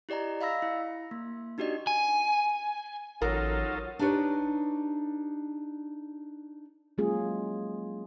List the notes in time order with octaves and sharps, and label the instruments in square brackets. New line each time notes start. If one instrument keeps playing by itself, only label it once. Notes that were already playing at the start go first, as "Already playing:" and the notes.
[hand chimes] E4 G4 D5 D#5 A#5
D#5 F5 B5 E6 A#6
E4
A#3
D4 D#4 F#4 G4 D5 D#5
[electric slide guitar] G#5
[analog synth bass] A1 [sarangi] F#3 [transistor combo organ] D#4 F4 A4 [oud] A#4
[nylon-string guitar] D4 D#4 G4 B4 C#5
[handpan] F#3 G#3 A#3 C#4 F4 G#4